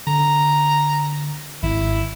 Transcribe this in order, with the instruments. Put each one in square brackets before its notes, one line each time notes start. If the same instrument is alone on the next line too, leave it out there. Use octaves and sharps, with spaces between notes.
[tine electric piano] D3 [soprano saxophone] A#5
[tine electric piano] G#1 [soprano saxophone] E4